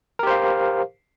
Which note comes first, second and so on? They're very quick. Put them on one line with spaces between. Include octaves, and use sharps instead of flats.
A#4 G4 C5 F5